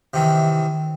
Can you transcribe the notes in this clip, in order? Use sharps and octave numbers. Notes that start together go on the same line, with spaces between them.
C3 D#3 E3